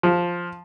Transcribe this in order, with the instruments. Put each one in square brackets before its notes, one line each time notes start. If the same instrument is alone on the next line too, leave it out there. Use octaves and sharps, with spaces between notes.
[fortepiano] F3